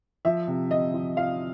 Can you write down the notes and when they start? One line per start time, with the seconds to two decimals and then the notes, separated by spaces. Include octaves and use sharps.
0.25 F3 E5
0.48 C3
0.71 C3 D#5
0.94 F3
1.17 F3 F5